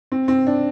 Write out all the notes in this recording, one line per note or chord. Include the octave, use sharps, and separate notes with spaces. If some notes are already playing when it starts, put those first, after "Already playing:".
C4
C4
D4